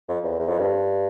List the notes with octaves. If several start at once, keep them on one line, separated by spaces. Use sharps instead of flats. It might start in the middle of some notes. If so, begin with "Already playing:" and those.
F2
E2
E2
F2
G2